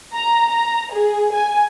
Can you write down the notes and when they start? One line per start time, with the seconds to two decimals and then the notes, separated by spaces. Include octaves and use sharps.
0.16 A#5
0.50 A#5
0.93 G#4
1.33 G#5